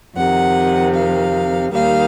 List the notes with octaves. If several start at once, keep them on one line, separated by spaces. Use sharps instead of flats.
F2 C3 D#3 F#5
F5
D#2 D#3 G3 F5